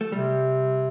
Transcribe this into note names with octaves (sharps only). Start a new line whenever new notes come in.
A3
C3 G3